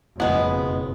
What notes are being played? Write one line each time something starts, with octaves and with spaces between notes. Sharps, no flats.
F#1 F2 B2 G#3 B3